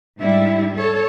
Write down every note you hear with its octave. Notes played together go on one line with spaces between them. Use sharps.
G#2 G3 D4 E4 E5
A4 C#5